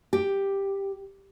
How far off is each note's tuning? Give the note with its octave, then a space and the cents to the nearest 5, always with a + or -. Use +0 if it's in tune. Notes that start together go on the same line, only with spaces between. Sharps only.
G4 +5